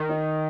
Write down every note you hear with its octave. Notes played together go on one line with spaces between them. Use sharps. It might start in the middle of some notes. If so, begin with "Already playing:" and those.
Already playing: D#3
D#4